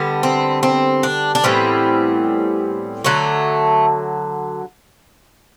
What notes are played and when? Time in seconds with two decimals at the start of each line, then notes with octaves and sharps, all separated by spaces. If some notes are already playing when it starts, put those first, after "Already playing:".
Already playing: D3 G3 B3
0.23 C4
0.63 C4
1.03 D4
1.35 D4
1.44 A2 E3 G3 B3 C4
3.04 D3 F#3 A3